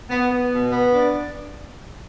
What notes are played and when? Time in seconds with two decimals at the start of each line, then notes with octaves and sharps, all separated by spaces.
0.10 B3
0.31 B3
0.52 B2
0.72 B3
0.93 D4